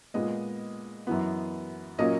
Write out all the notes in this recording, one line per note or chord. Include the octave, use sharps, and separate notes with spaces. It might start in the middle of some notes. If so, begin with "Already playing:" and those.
A#2 G#3 B3 D#5
F#2 E3 B3
A#2 F#3 A#3 C#4 D#5